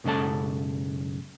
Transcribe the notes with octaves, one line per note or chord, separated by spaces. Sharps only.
B1 F#2 C#3 G#3 A4 A5